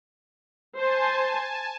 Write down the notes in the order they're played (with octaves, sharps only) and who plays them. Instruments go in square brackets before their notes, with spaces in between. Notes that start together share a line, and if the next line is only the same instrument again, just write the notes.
[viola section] C5 [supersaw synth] G#5 A5